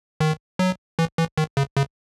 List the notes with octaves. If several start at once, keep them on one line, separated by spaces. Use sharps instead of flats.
D#3
F#3
E3
E3
D#3
C#3
C#3